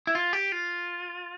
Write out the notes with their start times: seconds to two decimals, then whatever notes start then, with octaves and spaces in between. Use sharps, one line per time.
0.07 E4
0.15 F4
0.33 G4
0.52 F4